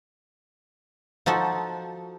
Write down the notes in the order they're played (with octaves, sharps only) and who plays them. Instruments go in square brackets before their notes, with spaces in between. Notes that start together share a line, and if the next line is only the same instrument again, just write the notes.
[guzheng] F3 D#4 F#4 A4 C5